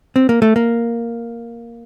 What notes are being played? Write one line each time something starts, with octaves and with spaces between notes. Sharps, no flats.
C4
A#3
A3
A#3